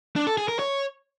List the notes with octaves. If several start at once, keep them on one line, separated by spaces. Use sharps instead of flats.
D4
A4
G#4
A#4
C#5